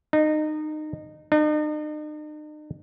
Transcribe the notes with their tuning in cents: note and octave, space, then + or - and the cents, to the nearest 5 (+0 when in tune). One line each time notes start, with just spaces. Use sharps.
D#4 -25
D#4 -45